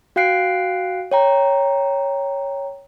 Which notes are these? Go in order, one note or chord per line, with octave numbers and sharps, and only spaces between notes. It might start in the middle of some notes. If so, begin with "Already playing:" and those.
F#4 F5 G5 F#6 C7 D7
C#5 G5 A#5